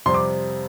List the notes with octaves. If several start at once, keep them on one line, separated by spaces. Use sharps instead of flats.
F2 C3 G3 C4 C6
D6